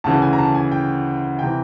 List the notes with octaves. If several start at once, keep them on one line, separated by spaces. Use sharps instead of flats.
D2 C#3 E3 A5
G#5
A#5
A5
G#5
G5
C3 E3 G5